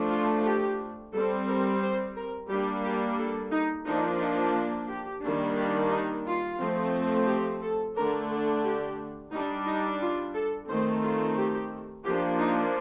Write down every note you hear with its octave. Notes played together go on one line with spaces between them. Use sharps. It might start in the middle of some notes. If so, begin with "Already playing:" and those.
Already playing: F3 A3 D4
F4
G4
G3 C4 A4
A#4
C5
A#4
G3 A#3 D4 G4
G4
A4
D#4
F3 A#3 D4 D#4
D#4
G4
D#3 G3 A#3 D4
G4
D#4
F4
F3 A3 C4
G4
A4
D3 A3 D4 A#4
A4
G4
G3 D4 D#4
D#4
F4
A4
D#3 A3 C4 C5
F4
G4
F3 A#3 D4 G4
D#4